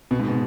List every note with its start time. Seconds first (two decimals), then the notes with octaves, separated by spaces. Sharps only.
0.11 B2
0.20 G#2
0.28 B2